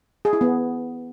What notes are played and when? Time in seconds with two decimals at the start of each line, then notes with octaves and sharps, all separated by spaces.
0.25 G#4
0.33 E4
0.41 B3